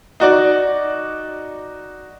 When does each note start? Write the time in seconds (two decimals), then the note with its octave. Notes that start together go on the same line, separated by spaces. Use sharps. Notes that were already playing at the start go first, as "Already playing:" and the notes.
0.20 D#4 F#4 D5